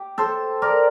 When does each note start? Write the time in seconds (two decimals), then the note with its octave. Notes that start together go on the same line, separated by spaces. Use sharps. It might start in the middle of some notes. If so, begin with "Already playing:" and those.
Already playing: G4
0.18 A4 C5
0.62 A#4 D5